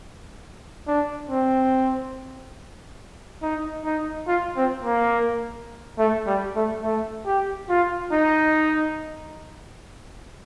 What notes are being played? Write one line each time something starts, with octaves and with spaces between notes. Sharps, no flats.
D4
C4
D#4
D#4
F4
C4
A#3
A3
G3
A3
A3
G4
F4
D#4